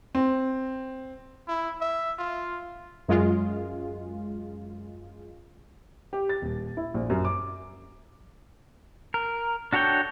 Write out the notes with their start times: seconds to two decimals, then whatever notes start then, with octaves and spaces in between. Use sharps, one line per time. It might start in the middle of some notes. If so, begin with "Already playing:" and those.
0.15 C4
1.48 E4
1.81 E5
2.19 F4
3.08 F#2 G#3 F4
6.13 G4
6.29 A6
6.42 D#1
6.77 E4
6.94 A#1
7.10 F#2
7.25 D6
9.14 A#4
9.73 D4 F#4 A4 C#5 G5